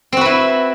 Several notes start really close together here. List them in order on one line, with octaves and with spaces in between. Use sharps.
C4 F#4 B4 E4